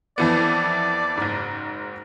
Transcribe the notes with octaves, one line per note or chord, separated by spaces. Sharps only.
F2 E3 B3 D5
F#1 G#2